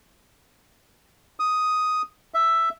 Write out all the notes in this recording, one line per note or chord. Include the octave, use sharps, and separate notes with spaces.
D#6
E5